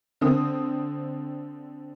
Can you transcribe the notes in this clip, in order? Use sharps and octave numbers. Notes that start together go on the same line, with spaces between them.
D3 C4 D#6